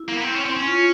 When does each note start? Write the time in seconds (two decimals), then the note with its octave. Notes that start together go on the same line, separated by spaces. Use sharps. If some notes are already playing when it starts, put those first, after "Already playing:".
Already playing: E4
0.09 A#3
0.16 B3
0.24 C4
0.34 C#4
0.45 C4
0.57 C#4
0.68 F4